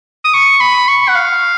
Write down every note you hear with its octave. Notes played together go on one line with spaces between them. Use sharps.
D#6
C#6
B5
C#6
F#5
F5